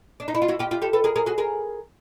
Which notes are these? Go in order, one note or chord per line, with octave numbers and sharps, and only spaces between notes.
D4
D#4
E4
F4
E4 F#4
F4 G4
F4 G4
G4 A4
A4 B4
G#4 A#4
G#4 A#4
F#4 G#4
G#4 A#4